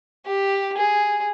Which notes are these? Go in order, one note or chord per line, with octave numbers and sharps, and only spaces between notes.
G4
G#4